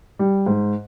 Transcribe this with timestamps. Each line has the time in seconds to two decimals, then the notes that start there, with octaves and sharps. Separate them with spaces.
0.19 G3
0.46 G#2